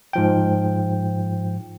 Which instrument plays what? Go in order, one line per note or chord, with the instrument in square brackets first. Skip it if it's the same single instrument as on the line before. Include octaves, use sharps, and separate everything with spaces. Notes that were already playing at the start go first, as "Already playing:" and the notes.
[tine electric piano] G#2 F3 G5